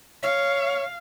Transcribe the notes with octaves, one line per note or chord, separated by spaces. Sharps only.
C#5 F5